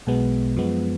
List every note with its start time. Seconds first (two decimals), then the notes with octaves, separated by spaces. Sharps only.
0.07 B1 B2 G#3 B3
0.57 F#2 F3 G#3 B3